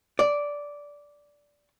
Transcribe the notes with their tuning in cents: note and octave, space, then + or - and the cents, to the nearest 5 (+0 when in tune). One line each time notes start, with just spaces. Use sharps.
D5 -10